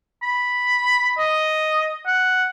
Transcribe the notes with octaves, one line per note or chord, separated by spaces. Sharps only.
B5
D#5
F#5